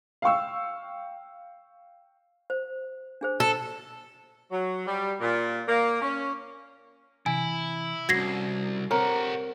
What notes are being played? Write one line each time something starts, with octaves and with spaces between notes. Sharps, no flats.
F5 G5 C#6 E6
C5
D4 G#4 C5
A4
F#3
G3
A#2
A#3
C#4
C3 E3 E4 G#5
C2 G2 C#4 F#4 G#6 A#6 C7
C4 G4 A#4 C#5 F#5